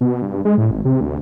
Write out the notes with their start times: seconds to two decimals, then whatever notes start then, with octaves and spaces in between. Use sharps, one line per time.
0.01 B2
0.22 G2
0.45 G#3
0.58 A2
0.71 G#1
0.85 C3
1.01 D2